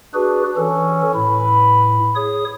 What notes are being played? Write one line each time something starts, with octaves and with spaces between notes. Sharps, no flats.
D4 F#4 G#4 B4
E3 C#4 A4
A2 B4
G#4 C#5 D#6